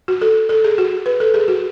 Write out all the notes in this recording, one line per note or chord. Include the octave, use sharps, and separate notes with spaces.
F#4
A4
A4
G#4
F#4
B4
A4
G#4
F#4